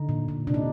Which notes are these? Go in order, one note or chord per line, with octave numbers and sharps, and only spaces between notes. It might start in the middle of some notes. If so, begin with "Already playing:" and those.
Already playing: D3 D#4
A#2
A#2
C3 D4
D#4